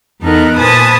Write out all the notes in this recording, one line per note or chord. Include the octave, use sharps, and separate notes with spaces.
E2 B3 D#4 A4 A#4 F#6
A#2 B4 C5 G#5 A5 D#6